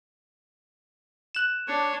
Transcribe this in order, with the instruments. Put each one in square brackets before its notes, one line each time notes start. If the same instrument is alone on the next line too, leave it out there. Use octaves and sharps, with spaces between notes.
[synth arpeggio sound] F#6 E7
[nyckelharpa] D4 [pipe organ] C#5